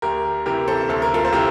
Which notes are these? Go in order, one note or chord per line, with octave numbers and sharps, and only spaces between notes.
D2 G4 A#4
C3 E3 G4 A#4
A4 C5
D2 A4
A#4
F4 A4
C5
C3 E3 G4 A#4